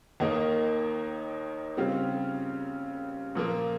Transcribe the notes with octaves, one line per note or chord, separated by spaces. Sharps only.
D#2 D#3 A#3 D#4
C#3 G3 C4 F4
A#2 F3 A#3